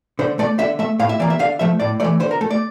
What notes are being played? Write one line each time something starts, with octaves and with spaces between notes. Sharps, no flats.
D3 C5
A3 D5
D3 E5
A3 E5
A2 F5
E5
E3 A#3 D5
E5
D3 F5
F3 A3 E5
A2 D5
E3 A3 D5
D3 C5
A#4
A3 A4
D5